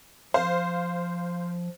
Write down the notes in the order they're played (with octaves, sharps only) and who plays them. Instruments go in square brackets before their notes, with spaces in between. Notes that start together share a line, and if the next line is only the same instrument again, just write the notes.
[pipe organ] F3 [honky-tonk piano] C5 F5